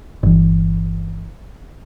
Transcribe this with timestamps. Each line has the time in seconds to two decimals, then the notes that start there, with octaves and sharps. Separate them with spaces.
0.23 G1 E3